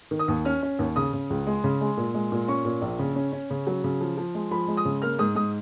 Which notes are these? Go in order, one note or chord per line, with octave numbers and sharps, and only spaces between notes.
D#3
D#6
D#2
C#4 F6
C#4
D#2
C#3 D#6
C#3
C#2
G#3
C#3
G#3
A#2
G#3
A#2
C#4 C#6
A#2
A#1
C#3
C#4
C#4
C#3
F#3
C#3
F3
F3
G#3
F3 B5
G#3
D#6
C#3
A#3 F6
G#2 D#6
G#2 D#6